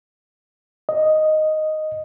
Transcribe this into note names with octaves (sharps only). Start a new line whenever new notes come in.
D#5